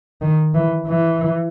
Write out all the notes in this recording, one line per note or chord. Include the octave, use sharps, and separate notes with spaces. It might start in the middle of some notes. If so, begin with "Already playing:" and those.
D#3
E3
E3